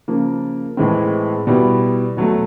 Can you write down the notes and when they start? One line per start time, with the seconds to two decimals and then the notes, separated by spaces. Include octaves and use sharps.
0.08 C#3 F3 A#3
0.77 A2 E3 G#3 C4
1.47 B2 G3 B3 E4
2.17 B2 F#3 A3